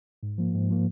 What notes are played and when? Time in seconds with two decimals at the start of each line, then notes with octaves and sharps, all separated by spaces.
0.23 G#2
0.38 F3 A#3
0.55 G#2
0.70 F3 A#3